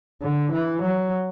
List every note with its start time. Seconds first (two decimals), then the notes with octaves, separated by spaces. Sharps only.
0.23 D3
0.52 E3
0.82 F#3